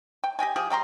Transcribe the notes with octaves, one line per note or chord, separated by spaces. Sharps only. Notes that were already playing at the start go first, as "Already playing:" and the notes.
G5
G4 D#5 G5 G#5
F3 G4 G#4
G3 G5 A#5 C6